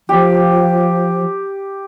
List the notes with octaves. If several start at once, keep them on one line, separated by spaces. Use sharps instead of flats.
F3 G4